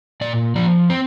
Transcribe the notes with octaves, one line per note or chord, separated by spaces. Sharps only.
A#2 D5
F3 D5
C4 C5